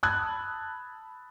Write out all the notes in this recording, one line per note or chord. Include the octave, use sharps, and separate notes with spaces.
A5 B5 D#6 E6 F#6 G#6